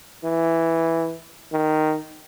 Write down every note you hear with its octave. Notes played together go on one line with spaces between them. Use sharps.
E3
D#3